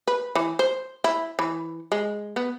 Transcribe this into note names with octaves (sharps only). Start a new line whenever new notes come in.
B4
E3
C5
E4
E3
G#3
B3